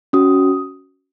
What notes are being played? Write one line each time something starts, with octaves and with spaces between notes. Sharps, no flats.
C#4 F#4 D#6